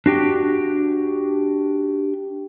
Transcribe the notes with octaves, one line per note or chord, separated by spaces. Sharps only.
D4 F#4 G4